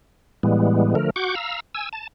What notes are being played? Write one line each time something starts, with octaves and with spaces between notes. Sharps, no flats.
A2 E3 G3 G#3 B3
D3 F3 A3 A#4
F#4 F#5 C#6 D6 G6
F5 A#5 E6
G#5 E6
A5